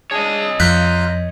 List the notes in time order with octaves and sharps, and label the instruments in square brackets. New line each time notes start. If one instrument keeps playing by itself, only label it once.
[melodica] D4 G#4 [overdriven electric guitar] C#5 D#5
[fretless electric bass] F2 [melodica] F4 F5 A#5 [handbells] F#6 G6 B6